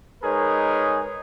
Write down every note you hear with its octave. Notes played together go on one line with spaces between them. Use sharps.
G#3 D#4 G#4 A#4 B4 C#5